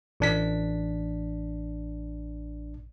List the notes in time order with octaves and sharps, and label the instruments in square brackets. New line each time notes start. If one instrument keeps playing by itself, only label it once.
[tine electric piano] A1 D4 B6